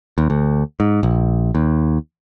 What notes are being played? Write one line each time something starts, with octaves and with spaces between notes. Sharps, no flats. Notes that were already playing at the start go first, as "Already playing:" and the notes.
D#2
D2
G#2
A#1
D#2